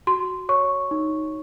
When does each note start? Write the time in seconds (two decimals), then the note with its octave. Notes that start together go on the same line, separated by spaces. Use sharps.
0.07 F#4 C6
0.49 C#5 C#6
0.91 D#4